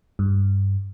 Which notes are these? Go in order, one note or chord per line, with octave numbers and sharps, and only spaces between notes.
G2